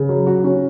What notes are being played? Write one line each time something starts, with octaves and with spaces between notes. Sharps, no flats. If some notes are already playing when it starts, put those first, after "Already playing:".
Already playing: C#3
F#3
F#4
C#4